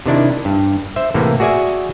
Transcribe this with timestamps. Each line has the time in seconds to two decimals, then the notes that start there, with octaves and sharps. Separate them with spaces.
0.06 C3 D#3 D4 E4
0.45 G2
0.96 C5 E5
1.14 A2 C3 E3 A#3
1.40 F#4 G#4 D5 E5 G#5